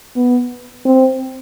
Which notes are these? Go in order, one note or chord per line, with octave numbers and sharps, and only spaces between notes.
B3
C4